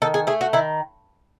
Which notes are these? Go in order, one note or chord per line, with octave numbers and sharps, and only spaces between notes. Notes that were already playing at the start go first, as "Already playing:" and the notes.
D#3 A4
G#4
A3 G#4
F#4
D#3 E4